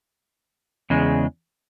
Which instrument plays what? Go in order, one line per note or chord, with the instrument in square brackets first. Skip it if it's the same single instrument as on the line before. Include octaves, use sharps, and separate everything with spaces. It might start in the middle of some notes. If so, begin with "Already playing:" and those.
[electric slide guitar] E2 C#3 G#3